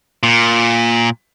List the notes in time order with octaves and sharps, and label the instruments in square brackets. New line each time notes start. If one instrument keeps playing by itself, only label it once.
[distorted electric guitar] A#2